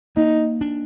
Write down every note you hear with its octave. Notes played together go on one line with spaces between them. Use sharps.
A#3 D#4
D4